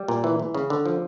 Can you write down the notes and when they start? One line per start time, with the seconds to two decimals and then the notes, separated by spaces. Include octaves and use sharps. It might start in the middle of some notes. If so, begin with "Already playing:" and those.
Already playing: G3
0.08 A#2
0.24 E3
0.39 E3
0.55 C#3
0.70 D3
0.86 F3